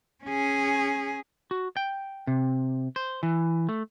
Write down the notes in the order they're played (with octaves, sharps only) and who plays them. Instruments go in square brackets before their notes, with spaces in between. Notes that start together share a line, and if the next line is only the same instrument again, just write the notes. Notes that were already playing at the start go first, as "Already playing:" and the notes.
[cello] C#4 G#4
[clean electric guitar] F#4
G5
C3
C5
E3
A3